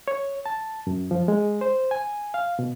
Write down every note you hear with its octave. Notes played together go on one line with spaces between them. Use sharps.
C#5
A5
F#2
F3
G#3
C5
G#5
F5
B2